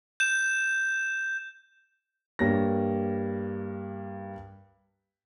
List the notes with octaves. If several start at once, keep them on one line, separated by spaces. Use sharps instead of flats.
G6 E7
G2 G3 A#3 C#5 A#6